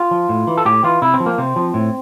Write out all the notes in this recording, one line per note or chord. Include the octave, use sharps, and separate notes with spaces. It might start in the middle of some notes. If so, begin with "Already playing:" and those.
Already playing: F4
F3
A2
E3
A4
A2 G4
E3 F4
C3 E4
C4
F3
A#3
C3 C4
F3
A2